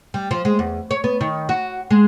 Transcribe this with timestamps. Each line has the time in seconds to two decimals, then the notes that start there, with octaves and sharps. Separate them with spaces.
0.14 G3
0.31 F3
0.45 G#3
0.59 E2
0.91 C#5
1.04 B3
1.21 D#3
1.49 F#4
1.91 G#3